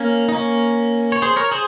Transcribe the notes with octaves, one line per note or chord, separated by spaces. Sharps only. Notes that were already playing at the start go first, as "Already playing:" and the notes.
Already playing: A#3 C#4
D#4
A#3 C#4
C#5
G#4 C5
A#4 C#5
G#4 C5